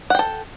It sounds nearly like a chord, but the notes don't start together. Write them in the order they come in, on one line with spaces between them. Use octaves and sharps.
F#5 G5 A4